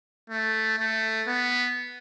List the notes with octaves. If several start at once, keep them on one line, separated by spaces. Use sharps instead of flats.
A3
A3
B3